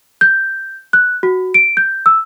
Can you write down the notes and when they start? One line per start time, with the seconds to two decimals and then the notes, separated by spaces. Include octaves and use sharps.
0.21 G6
0.93 F#6
1.23 F#4
1.54 D7
1.77 G6
2.06 E6